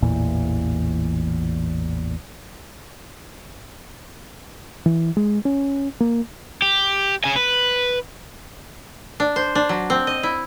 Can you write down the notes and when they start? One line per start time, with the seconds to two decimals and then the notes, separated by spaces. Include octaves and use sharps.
0.02 A1 E2 A#2 E3
4.86 E3
5.17 G#3
5.45 C#4
6.00 A#3
6.62 G4
7.24 C#3 G#5
7.36 B4
9.20 D4
9.36 C5
9.55 D4
9.69 F#3
9.90 C4
10.07 D#5
10.23 E4